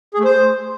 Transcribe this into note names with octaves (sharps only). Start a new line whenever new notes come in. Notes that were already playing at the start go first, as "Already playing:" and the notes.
G#4
A3
C5